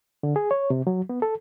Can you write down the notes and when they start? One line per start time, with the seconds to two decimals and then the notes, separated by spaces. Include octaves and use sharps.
0.23 D3
0.36 G#4
0.51 C#5
0.70 C3
0.87 F#3
1.09 B3
1.22 A4